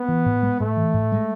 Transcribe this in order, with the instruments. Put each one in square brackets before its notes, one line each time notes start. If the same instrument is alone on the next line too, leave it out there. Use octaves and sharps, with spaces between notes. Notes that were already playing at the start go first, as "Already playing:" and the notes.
Already playing: [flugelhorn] B3
[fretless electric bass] E3
A2
G#3
[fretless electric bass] A2 [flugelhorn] A3
[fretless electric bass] E3
A2
G#3